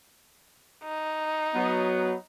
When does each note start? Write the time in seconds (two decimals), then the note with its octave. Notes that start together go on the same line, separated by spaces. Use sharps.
0.84 D#4
1.54 F#3 B3